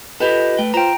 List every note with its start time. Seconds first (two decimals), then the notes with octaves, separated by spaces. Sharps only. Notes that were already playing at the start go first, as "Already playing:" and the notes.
0.20 F4 G4 A4 B4 D#5
0.59 A3 G5
0.74 F4 C5 G5 A#5